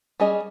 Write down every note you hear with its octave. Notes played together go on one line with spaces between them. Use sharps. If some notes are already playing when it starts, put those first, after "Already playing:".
G3 C#4 G#4 D#5